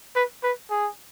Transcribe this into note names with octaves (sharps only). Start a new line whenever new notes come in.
B4
B4
G#4